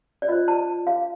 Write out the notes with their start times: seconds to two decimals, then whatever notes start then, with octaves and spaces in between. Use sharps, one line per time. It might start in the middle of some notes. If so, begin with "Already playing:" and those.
0.22 D5
0.28 F4 D#5
0.32 C5
0.48 A5
0.87 F5